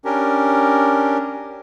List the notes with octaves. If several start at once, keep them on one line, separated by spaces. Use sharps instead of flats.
C#4 D4 G4 A#4